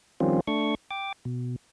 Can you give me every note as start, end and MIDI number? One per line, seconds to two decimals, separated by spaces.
0.20 0.41 51
0.20 0.41 53
0.20 0.41 55
0.20 0.41 60
0.20 0.41 61
0.20 0.41 65
0.47 0.75 57
0.47 0.75 62
0.47 0.75 85
0.91 1.13 79
0.91 1.13 86
1.25 1.56 47